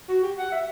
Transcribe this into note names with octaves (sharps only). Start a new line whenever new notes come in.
F#4
G4
F#5
E5